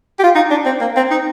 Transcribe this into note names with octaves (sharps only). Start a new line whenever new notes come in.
G4
F4
D#4
D4
C4
A#3
C4
D#4